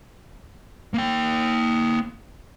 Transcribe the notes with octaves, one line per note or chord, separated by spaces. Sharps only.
A#3 G5